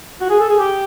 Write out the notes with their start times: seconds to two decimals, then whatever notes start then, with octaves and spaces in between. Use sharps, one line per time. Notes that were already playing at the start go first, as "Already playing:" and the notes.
0.21 F#4
0.30 G#4
0.40 A4
0.49 G#4
0.59 G4